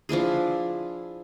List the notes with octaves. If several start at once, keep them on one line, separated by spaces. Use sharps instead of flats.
F3 D4 E4 G#4